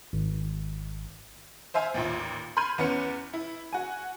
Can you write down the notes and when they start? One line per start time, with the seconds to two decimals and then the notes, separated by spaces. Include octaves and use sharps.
0.13 G#1
1.74 C5 E5 F5 G#5
1.94 A1 D#2 A#2
2.57 B5 C6 F6 G6 G#6 D#7
2.78 E2 B3 C#4 F6 C#7
3.34 E4
3.73 F#4 G#5